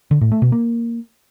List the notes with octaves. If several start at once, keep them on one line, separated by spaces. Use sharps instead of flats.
D3
A2
A3
B2
A#3